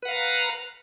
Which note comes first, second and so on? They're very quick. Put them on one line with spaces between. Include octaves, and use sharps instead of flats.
B4 F#5 F5 A#5